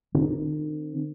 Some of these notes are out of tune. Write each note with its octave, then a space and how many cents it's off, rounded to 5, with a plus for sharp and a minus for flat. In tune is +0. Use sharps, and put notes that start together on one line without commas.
D#3 -40 C4 +0